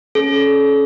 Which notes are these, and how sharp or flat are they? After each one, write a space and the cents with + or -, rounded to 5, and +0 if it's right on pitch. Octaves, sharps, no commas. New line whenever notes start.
C#4 +0 A4 -40